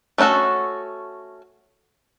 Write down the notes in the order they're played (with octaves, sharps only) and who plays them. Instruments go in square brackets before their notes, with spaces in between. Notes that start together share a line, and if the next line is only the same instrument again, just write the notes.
[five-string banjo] A3 C#4 D#4 F#4 A4